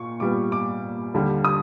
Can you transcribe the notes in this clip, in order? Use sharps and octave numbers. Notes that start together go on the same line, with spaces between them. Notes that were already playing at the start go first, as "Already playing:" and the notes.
Already playing: A#2 C#6
A#2 G3 B3 D6
D6
D#2 D3 G3
D#6